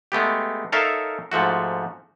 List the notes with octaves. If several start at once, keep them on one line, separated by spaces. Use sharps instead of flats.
G#3 A3 B3 G4
D#4 A4 A#4 C#5 E5 F5
G#2 F3 A3 F#4